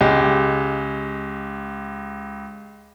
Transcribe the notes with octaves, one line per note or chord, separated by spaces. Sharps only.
C#2 G#3 G4